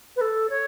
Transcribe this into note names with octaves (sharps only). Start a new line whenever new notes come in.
B4
A4
C#5